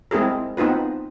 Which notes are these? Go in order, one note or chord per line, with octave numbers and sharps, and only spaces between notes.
G#3 C4 E4 G#4 A#4
B3 C4 D#4 F4 B4